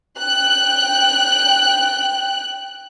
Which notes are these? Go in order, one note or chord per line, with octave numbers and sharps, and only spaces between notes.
G5 F#6